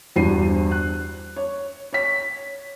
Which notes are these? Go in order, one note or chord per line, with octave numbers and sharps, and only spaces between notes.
E2 G2 F#4 C5 C7 D#7
F#6
C#5
C#5 B6